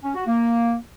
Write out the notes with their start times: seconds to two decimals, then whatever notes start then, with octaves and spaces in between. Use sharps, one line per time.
0.03 C#4
0.15 F#4
0.27 A#3